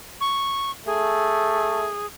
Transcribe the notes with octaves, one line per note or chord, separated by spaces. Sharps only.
C#6
A3 G#4